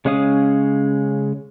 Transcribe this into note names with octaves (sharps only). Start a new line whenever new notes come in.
C#3 G#3 C#4 F5 D#6